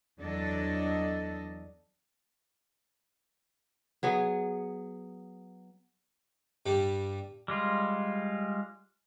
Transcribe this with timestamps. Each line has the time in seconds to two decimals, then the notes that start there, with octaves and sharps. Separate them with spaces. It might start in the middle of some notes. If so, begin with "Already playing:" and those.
0.19 E2 F#3 D4 A4 D#5
4.03 F#3 B3 G#4
6.66 G2 G3
7.48 G3 G#3 F4